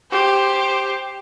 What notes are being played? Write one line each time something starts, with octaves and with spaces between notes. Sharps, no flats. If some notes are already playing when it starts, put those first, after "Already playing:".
G4 C5